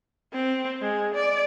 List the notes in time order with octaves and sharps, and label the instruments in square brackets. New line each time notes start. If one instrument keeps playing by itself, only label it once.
[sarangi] C4
G#3
D5